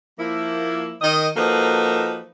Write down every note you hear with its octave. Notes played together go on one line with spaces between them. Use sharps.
F3 A#3 E4
D#3 D#5
F3 A#3 D#4 F#4 A4 B4